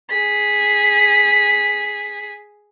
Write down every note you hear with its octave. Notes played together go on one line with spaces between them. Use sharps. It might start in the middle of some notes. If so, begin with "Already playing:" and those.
G#4 B6